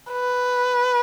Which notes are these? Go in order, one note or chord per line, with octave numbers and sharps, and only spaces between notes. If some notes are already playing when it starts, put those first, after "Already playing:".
B4